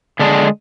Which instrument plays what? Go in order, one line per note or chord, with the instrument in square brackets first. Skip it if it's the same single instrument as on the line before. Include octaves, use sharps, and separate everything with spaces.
[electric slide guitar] D3 G#3 D4 G#4